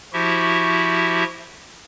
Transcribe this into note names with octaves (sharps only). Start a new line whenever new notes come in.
F3 E4 F#4 G4 E5